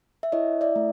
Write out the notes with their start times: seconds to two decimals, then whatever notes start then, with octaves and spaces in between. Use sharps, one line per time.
0.23 E5
0.32 E4 C#5 D#5
0.61 D5 E5
0.76 A3